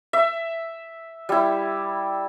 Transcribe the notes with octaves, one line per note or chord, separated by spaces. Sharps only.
E5
G3 E4